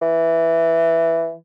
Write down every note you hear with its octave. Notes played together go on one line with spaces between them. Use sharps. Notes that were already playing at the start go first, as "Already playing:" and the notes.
E3